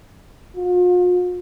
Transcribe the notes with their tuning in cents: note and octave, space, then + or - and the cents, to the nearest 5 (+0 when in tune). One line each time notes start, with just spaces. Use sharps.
F4 +40